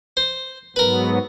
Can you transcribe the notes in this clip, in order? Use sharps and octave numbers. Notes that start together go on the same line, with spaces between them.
C5
G#2 F#3 B3 A#4 B4